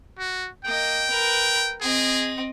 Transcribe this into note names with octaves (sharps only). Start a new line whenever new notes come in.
F#4
A#3 D#5 G5
A#4 B4
C4 G#4 D#5